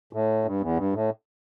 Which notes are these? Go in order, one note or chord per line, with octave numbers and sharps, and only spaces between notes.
A2
G2
E2
G2
A2